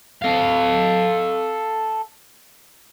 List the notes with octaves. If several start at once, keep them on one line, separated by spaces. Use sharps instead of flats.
A4 F5